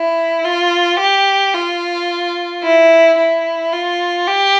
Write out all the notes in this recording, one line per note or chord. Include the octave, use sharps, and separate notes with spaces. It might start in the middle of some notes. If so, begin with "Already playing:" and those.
Already playing: E4
F4
G4
F4
E4
E4
F4
G4